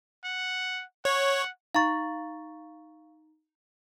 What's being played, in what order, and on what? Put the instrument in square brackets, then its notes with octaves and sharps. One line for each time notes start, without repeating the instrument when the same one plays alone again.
[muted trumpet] F#5
[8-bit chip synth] C#5 [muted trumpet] F#5
[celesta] D#4 A#5 A6 [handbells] F5 C#6